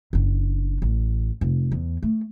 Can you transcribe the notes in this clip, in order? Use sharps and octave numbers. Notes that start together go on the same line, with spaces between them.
F#1 D4
A1
F1
E2
A3